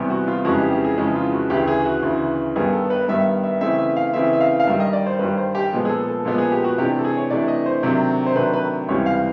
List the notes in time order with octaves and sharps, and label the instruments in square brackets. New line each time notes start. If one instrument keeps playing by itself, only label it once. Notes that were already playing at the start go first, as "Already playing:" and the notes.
Already playing: [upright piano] E2 C3 E3 G3 B3
F#4
F4
F2 C#3 E3 G#3 C#4 F#4
G4
G4
G#4
F2 C#3 E3 G#3 C#4
F4
F#4
D2 C#3 E3 G4
G#4
F#4
D2 C#3 E3
G2 D#3 G3 B3 G#4
A4
B4
G2 D#3 G3 B3 E5
E5
C#3 E3 A3 C4 E5
E5
F5
C#3 E3 A3 C4 E5
E5
F5
F5
G2 D#3 G3 E5
D#5
D5
C5
G2 D#3 G3 B4
C5
G4
A#2 F3 G#3 B3
G#4
A4
A4
A#2 F3 G#3 B3 A4
G#4
G4
F#4
C3 E3 A3 D4 G4
A4
G#4
C#5
C3 E3 A3 D4 D5
D#5
C5
C3 D#3 F#3 A3 D4
C5
C3 D#3 F#3 A3 D4 B4
B4
C#2 C3 E3 G3 C#5
F5